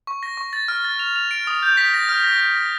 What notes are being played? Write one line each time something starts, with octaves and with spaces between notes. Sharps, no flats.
C#6
A#6
C#6
A6
F6
A6
F7
F7
D7
D#6
G6
B6
A#6
F6
A#6
A#6
A#6